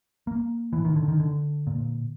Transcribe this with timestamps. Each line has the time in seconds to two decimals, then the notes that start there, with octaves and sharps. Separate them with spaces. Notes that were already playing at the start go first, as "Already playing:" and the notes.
0.27 A#3
0.73 A2 E3
0.85 D#3
0.96 D3
1.08 D#3
1.20 D3
1.67 A#2